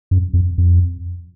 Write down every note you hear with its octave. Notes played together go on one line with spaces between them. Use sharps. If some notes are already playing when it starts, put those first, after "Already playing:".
F#2
F2
F2